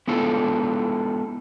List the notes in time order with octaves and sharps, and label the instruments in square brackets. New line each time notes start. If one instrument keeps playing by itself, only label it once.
[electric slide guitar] G#3 B3 E4 F4 A4